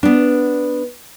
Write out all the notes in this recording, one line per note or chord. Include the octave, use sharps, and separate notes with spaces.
B3 D4